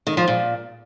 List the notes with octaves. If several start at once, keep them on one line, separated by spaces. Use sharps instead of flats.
D#3
F3
A#2